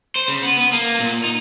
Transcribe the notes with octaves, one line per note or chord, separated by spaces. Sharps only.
C5
C#3
B3
B3
A#3
A#2
D#4